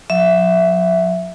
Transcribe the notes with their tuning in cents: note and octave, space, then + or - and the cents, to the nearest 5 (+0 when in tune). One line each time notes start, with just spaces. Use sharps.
F#3 -45 E5 +0